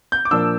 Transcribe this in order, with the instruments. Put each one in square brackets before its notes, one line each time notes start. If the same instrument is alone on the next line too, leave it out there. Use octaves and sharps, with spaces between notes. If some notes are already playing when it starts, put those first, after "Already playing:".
[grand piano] G6
D6
A#2 F3 A#3 D4 E6